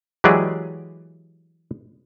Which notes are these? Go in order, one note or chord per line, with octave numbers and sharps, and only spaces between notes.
E3 F#3 G#3 G4 G#4 D5